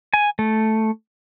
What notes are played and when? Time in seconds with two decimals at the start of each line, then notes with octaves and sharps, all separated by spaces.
0.14 G#5
0.39 A3